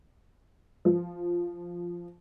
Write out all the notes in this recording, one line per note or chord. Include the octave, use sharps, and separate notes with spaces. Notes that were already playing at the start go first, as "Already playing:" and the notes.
F3